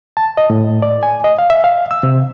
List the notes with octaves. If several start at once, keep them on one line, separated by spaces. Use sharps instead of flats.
A5
D#5
A2
D5
G#5
D#5
F5
E5
F5
E6
C3